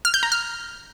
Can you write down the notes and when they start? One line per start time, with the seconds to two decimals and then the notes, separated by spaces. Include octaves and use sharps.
0.05 F6
0.14 G6
0.23 A#5
0.32 F6